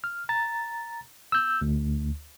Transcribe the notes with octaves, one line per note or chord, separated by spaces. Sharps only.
F6
A#5 A6
E6 G6
D2